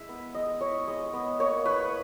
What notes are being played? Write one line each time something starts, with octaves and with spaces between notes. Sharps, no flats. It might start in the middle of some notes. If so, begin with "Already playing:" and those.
Already playing: G#3 E4 E5
B3
G#3 D#5
E4 C#5
G#3 D#5
B3
A#3 C#5
E4 B4